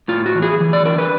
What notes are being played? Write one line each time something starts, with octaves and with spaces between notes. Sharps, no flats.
A2 F4
F#4
E3
G#4
E3
D5
D4 A#4
B4